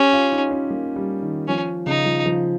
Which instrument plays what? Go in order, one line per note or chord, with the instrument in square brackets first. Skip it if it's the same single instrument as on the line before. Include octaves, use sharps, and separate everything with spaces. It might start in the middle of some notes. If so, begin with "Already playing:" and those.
Already playing: [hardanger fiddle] C#4 [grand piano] G4
[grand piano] F4
D#4
C#4
A#3
G3
D#3
[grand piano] F3 [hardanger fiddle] C#4
[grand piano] C#3 [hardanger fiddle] D#4
[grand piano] F3
F3